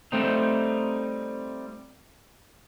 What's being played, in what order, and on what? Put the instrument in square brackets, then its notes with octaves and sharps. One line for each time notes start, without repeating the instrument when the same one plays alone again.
[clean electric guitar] G3 A3 C4 D#4